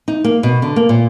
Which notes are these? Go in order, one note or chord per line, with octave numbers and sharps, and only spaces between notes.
D#4
A#3
B2
D3
A#3
A#2